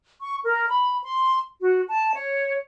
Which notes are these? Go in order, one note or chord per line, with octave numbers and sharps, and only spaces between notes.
C#6
A#4
B5
C6
F#4
A5
C#5